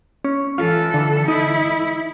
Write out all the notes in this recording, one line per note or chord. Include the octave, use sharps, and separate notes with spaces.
C#4
E3 F4 A4
D3
D#4 E4